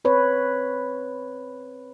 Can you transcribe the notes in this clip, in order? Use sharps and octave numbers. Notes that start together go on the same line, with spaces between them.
C4 B4 C#5